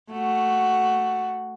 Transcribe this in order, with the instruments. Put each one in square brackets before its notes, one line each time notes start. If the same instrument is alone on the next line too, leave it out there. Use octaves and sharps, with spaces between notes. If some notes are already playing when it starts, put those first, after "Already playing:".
[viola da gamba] A3 F#4